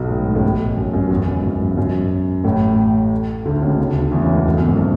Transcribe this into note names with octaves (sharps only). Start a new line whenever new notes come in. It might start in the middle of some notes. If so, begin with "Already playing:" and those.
Already playing: B1 B2
A2
G#2
A1 A2
F#2
F#2
E2
F#2
G#2
F#2
G#2
F#2
A1 A2
D2 D3
C#2 C#3
C#2 C#3
D2 D3
D2 D3
E2 E3
C#2 C#3
E2
F#2
F#2
G#1 G#2
B2